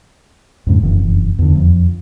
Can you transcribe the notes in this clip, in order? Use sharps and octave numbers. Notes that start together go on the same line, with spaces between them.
F2 G#2 C#3
F1 F#2 E3
E2 D3
F2